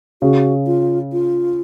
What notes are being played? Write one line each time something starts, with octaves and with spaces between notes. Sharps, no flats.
C#3 F#4
F4
F4